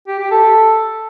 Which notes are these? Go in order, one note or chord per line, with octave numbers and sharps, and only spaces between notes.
G4
G4
A4